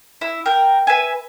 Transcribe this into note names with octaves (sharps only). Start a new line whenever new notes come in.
E4
A#4 G5
B4 E5 G#5